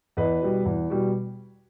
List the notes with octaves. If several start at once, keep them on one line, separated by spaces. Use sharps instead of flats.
E2 B4 D#5
B2 G3
E2
B2 G3